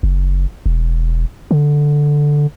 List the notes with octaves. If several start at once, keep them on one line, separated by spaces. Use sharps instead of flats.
F#1
E1
D3